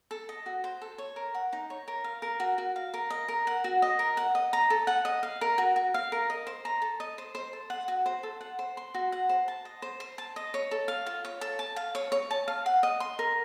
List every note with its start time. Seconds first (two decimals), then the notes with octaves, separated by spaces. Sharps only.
0.11 A4
0.29 D#5
0.46 F#4
0.64 C5
0.82 A4
0.98 C#5
1.16 A#4
1.34 F#5
1.53 D#4
1.70 C#5
1.88 A#4
2.04 F5
2.22 A#4
2.40 F#4
2.58 F#4
2.76 F5
2.94 A#4
3.10 D#5
3.28 A#4
3.47 F#5
3.64 F#4
3.82 D#5
3.99 A#4
4.17 F#5
4.35 D#5
4.53 A#5
4.70 A4
4.87 F#5
5.05 D#5
5.23 F5
5.41 A#4
5.58 F#4
5.76 F#4
5.94 F5
6.12 A#4
6.30 D#5
6.47 C5
6.65 A#5
6.82 A4
7.00 D#5
7.18 C5
7.35 C5
7.53 A4
7.70 F#5
7.88 F#4
8.06 C5
8.23 A4
8.41 F#5
8.59 C5
8.77 C6
8.94 F#4
9.12 F#5
9.29 C5
9.48 A5
9.65 D#5
9.82 C5
10.00 C5
10.18 A5
10.36 D#5
10.54 C#5
10.71 A4
10.88 F5
11.06 F4
11.25 C#5
11.41 A4
11.59 A5
11.76 F5
11.95 C#5
12.12 C#5
12.31 A5
12.48 F5
12.66 F#5
12.83 D#5
13.00 C6
13.19 A#4